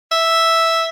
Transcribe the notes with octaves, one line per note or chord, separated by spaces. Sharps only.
E5